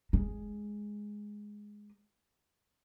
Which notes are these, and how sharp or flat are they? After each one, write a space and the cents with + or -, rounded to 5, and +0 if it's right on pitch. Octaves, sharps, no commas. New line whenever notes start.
G#3 +0